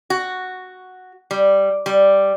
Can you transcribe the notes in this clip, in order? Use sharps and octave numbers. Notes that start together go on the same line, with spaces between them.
F#4
G3
G3